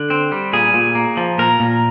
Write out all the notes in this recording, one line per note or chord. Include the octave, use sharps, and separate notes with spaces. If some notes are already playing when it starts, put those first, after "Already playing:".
Already playing: D3
C4
G3
A#2 G#4
A#2
A#3
F3
A#2 A#4
A#2